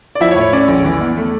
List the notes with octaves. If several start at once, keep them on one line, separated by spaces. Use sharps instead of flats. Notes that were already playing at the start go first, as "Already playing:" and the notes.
D5
F3 E4 E5
C#5
A2
C#5
C#4 D5
A#1
E3
E2
A3